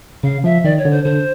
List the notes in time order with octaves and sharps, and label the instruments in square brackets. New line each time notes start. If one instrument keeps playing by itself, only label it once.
[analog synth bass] C#3 [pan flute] F5
[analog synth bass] F3 [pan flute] E5
[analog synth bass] D#3 [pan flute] D5
[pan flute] C#5
[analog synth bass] D3
[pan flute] C5
[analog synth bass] D3 [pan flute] C5